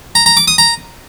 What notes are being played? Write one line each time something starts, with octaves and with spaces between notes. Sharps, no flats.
A#5
A#5
D6
D#6
A#5